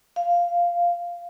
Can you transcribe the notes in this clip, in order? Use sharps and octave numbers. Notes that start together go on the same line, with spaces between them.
F5